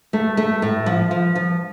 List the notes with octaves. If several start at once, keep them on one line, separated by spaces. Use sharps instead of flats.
A3
A3
A2
F3
F3
F3